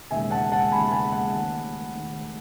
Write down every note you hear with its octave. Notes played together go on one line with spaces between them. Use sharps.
E1 D#2 C#3 G#3 E5 G#5
F#5 A5
F#5 A5
E1 D#2 C#3 G#3 G#5 B5
G#5 B5
F#5
D#2 D#3 A3 F#5
D#2 D#3 A3